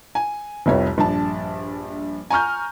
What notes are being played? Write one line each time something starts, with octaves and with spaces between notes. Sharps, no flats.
G#5
F1 C2 F2 C#5
A#1 G2 D4 A5
G#5 A#5 C#6 F6 G6